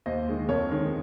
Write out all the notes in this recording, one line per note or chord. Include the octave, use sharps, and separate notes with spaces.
D#2 C5 D#5
D#3 G#3
F2 A#4 C#5
D#3 G#3